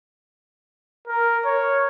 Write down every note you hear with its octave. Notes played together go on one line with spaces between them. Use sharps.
A#4
C#5